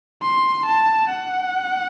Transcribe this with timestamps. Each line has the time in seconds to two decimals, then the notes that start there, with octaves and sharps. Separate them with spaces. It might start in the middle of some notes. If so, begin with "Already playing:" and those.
0.22 C6
0.66 A5
1.09 F#5